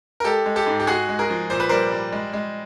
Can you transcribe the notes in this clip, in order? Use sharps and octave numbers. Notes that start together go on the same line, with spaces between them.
A#4
G#3 G4 A4
G#3
G4 A4
G#2
G4
G#3 F#4 G#4
G#3
G#4 A#4
F3
A#2 C5
B4
G3 A#4 C5
G3
G#3
G#3